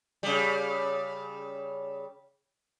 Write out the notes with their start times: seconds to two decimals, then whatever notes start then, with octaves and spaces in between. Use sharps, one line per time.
0.23 C#3 G3